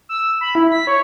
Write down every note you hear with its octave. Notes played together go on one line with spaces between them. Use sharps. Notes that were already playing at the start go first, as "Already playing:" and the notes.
E6
B5
E4
B6
C#5